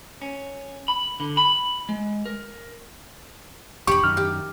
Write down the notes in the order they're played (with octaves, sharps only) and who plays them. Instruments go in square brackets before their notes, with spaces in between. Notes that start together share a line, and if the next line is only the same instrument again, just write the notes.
[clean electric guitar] C#4
B5
D3
B5
G#3
A#4
[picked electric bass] E1 [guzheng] G4 B5 [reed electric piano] C#6
[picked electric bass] F#2 D#3 [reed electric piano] F6
[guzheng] G4